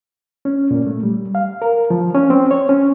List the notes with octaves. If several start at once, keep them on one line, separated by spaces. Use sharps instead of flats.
C#4
A#2
A3
G3
F5
A#4
F3
C#4
C4
C#5
C#4